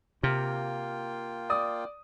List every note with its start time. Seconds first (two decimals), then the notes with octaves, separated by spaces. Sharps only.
0.23 C3 A#3 F4 G5 F6
1.50 D5 D#6